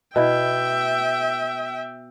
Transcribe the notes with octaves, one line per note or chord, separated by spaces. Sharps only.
B2 E4 E5 G5